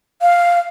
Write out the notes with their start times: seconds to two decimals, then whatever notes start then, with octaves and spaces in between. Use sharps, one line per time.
0.22 F5